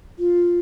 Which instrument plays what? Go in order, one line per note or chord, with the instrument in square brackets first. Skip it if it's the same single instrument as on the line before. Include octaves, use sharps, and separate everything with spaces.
[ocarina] F4